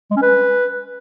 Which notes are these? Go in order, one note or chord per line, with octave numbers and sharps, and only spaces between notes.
G#3
C#4
B4